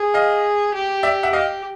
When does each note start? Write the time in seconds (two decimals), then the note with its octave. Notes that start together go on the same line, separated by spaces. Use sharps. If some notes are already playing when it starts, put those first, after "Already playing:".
Already playing: G#4
0.14 D#5 F5
0.74 G4
1.03 D5 E5
1.23 E5 F#5
1.32 G4 D#5 F5